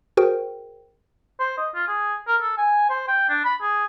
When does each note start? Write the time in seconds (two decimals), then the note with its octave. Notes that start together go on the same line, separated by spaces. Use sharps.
0.17 F#4 G#4 A#4 C5 G5
1.40 C5
1.57 D#5
1.75 F4
1.88 G#4
2.27 A#4
2.41 A4
2.58 G#5
2.90 C5
3.08 G5
3.29 D4
3.45 B5
3.62 G#4